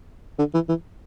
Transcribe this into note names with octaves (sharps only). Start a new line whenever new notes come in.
D3
E3
E3